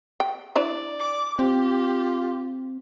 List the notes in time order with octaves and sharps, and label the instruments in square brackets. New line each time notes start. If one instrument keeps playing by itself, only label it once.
[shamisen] G5
[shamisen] D4 E4 C5 [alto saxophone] D5
[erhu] D6
[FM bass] C4 [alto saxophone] F4 [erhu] G4